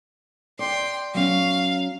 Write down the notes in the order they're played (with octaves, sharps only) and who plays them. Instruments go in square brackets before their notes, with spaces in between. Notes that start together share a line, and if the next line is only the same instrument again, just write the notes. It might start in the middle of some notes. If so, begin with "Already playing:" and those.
[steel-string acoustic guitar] D5 [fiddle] G5 C6
[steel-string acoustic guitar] F#3 C#4 [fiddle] F5